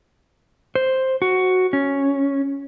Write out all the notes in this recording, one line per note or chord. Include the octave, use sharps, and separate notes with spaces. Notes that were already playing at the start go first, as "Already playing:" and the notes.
C5
F#4
C#4